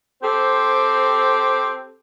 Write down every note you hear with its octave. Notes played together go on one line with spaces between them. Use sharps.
C4 G4 A4 C5